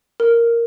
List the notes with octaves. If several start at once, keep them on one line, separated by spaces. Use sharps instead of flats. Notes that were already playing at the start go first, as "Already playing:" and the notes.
A#4